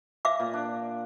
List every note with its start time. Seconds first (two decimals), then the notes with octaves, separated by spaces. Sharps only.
0.25 E5 F5 D6
0.39 A#2
0.54 D4